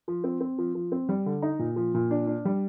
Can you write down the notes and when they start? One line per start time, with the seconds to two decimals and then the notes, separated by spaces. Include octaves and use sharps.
0.08 F3
0.24 C4
0.41 C4
0.58 F3
0.75 F3
0.92 C4
1.09 G3
1.26 D3
1.42 D#4
1.59 A#2
1.76 F3
1.94 A#2
2.11 D4
2.27 D4
2.45 G3